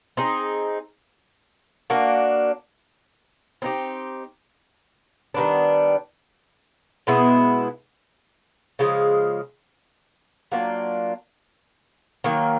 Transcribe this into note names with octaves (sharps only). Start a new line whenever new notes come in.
C4 D#4 G#4
A#3 D4 F#4
C4 D#4 G4
D#3 G3 B3 D4
B2 G#3 B3 E4
C#3 F3 G#3
F#3 A#3 D4 F4
D#3 F#3 A#3